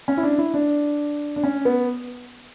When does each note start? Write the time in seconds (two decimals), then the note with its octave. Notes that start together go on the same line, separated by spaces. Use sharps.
0.08 C#4
0.17 E4
0.23 D4
0.38 E4
0.54 D4
1.36 D4
1.43 C#4
1.65 B3